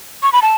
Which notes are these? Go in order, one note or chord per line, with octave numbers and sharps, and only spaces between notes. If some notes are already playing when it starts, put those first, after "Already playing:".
C#6
B5
A5